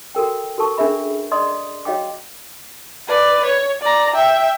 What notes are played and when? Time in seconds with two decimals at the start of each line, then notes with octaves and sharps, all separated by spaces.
0.15 F#4 A4 A#4 G5
0.58 F#4 A4 A#4 A5 C#6
0.78 C#4 D4 G#4 A#4 E5 B5
1.31 D5 D#5 C6 D#6
1.85 F#4 C#5 D#5 F5 G5 D6
3.08 B4 D5
3.45 C#5
3.82 D5 A#5
4.14 E5 G5